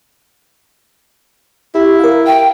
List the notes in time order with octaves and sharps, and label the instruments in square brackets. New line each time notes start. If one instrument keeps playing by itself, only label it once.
[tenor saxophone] E4 [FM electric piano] G4
[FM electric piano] A#4 F5
[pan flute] G5